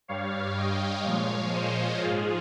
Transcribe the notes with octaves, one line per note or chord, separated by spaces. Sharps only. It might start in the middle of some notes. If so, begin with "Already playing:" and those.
G2 G3 C#5 F5
D#5 G5
A#2 F3 G#3 C#5 F5
C5 D#5
G#2 F3 G#3 F4 G#4